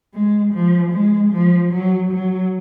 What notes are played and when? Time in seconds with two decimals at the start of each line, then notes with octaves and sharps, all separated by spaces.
0.14 G#3
0.53 F3
0.92 G#3
1.32 F3
1.72 F#3
2.11 F#3